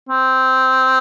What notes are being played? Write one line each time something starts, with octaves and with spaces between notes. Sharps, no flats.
C4